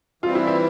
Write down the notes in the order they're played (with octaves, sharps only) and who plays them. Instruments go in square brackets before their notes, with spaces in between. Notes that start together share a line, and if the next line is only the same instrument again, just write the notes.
[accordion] E3 G3 C4 [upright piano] F4
[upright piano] E4
E4